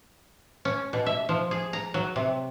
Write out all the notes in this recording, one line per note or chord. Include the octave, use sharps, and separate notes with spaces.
C#4
B2
E5
F3
G#4
A#5
F#3
C3